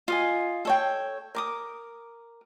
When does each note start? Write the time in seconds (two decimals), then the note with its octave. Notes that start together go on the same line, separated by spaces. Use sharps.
0.08 F4 D#5 G#5
0.65 A4 C#5 G5
1.35 A#4 D6 D#6